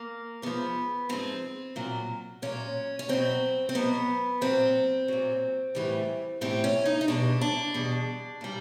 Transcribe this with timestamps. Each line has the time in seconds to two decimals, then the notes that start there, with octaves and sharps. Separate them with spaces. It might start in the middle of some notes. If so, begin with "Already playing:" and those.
Already playing: A#3
0.42 G#2 F3 B3
1.09 G#2 F3 C4
1.76 A#2 F#3
2.42 A#2 F#3 C#4
2.99 C#4
3.09 B2 F#3 C4
3.69 C4
3.75 B2 F#3 B3
4.41 A#2 F#3 C4
5.08 A#2 F#3
5.75 A2 E3 G3
6.41 A2 E3 G3 C4
6.64 C#4
6.86 D#4
7.01 D#4
7.08 E2 B2 G3 D4
7.41 D4
7.74 E2 B2 G3
8.41 A#2 G3